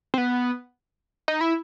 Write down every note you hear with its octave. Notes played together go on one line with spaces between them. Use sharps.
C4
B3
D#4
E4